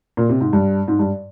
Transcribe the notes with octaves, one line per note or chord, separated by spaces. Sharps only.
A#2
C3
G#2
G2
G#2
G2